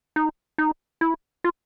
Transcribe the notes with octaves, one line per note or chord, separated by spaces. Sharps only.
D#4
D#4
E4
F4